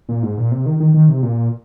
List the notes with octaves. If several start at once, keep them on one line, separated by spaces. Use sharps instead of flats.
A#2
G#2
A#2
C3
D#3
D#3
D#3
C3
A#2